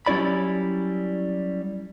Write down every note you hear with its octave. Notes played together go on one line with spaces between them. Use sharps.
F#3 G3 C#4 E4 D5 B5